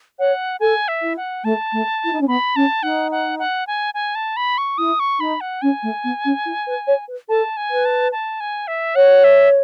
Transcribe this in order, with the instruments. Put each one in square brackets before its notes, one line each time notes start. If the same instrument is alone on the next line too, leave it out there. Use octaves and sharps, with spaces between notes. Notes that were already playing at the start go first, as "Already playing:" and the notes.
[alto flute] C#5 [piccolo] F#5
[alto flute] A4 [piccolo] G#5
[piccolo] E5
[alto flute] E4
[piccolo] F#5
[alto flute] A3 [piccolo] A5
[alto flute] A3
E4
D#4
C#4
[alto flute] B3 [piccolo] B5
[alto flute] C#4 [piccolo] A5
[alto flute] D#4 [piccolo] F#5
[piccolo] F#5
F#5
G#5
G#5
A5
B5
C#6
[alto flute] E4 [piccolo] D#6
[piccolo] C#6
[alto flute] D#4 [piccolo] B5
[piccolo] F#5
[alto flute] C#4 [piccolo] G#5
[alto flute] A3
B3
C#4
E4
B4
C#5
B4
[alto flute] A4 [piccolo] A5
[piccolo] G#5
[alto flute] B4
[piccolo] A5
A5
G#5
E5
[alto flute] C#5 [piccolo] F#5
[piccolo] E5